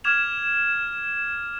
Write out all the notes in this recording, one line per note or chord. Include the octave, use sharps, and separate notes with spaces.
D6 F6 G#6 E7 F7